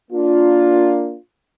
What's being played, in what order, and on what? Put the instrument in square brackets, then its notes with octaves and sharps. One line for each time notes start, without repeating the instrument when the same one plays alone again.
[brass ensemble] A#3 D4 F4